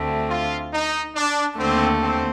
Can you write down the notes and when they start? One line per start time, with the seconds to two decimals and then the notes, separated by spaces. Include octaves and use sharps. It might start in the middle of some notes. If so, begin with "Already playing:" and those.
Already playing: D2 D3 A3 C4
0.28 F4
0.72 D#4
1.15 D4
1.58 D#2 D3 A3 C4
2.01 C4